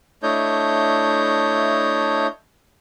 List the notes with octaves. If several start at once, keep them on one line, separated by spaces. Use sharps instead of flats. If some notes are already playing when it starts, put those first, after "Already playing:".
A3 D4 E4 C#5 D#5 G6